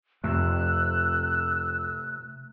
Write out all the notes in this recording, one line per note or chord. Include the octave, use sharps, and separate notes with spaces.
F2 C3 A3 E6 F#6